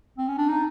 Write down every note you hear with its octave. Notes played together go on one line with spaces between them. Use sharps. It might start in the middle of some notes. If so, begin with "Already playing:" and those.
C4
C#4
D4
D#4